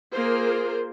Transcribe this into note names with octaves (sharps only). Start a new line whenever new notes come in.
A#3 F4 G#4 A#4 C5